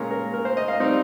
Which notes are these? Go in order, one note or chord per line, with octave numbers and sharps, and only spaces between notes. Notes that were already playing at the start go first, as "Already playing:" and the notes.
Already playing: A#2 G#3 C#4 F4 A#4
A#4
A#4
C5
D#5
F5
G3 C4 D#4